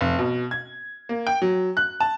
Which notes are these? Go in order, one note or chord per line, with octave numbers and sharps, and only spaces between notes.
F1
B2
G#6
A#3
G5
F#3
F#6
A5